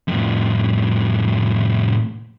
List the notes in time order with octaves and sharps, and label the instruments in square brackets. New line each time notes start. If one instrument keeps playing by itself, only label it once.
[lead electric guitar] F2 A2